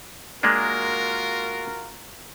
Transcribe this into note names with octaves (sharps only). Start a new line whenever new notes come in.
G#3 A#3 D4 F4 F#4 A#4